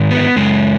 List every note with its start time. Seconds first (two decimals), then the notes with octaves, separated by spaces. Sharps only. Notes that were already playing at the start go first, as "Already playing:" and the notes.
Already playing: G#2 D#3
0.11 B3
0.36 F#2 C#3 G#3